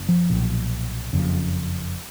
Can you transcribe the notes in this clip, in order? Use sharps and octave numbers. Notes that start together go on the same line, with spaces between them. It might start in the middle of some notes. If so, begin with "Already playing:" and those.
Already playing: F#1 F#2
F3
B1 A#2
F#1 F2 C#3